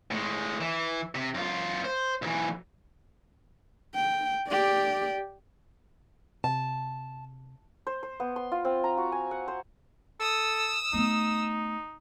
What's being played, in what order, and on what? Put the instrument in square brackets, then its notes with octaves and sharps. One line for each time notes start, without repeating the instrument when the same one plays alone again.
[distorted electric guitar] A2 G#3
E3
C3
F#2 F4
C5
B1 E3
[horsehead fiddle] G5
G4 D5
[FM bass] C3 [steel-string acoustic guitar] A5
[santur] C5
C5
B3
C6
F4
C4
A#5
F#4
G#5
F#5
C5
[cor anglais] A4 [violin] D#6 E6
[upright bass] A3 B3 [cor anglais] D#4